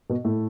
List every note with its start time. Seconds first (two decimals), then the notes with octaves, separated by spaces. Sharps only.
0.10 B2 B3
0.24 A2 A3